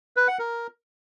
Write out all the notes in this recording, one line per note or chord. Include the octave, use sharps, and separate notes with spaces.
B4
F#5
A#4